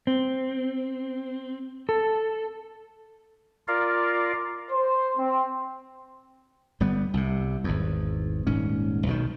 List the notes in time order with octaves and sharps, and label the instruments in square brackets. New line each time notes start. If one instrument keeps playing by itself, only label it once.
[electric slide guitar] C4
A4
[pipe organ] F4 A#4 D5 F5
[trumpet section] C5
C4
[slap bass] G1 G3 B3
C2 C3
G#1 E2
D#1 G#2 C#4
B1 B2 D#3